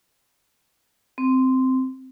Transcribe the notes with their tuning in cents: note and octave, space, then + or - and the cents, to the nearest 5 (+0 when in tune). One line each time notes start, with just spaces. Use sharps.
C4 -10